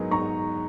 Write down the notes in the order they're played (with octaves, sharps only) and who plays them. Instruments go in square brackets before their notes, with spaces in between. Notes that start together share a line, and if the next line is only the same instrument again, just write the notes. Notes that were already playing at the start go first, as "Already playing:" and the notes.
Already playing: [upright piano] G#2 F#3 B3 D#4 G#4 [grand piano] A#4
[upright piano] G#2 [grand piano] A#5 C#6